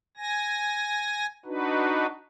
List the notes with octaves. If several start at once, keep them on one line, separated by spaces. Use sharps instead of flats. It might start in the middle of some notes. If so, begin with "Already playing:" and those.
G#5 A#6
D4 D#4 F#4 B4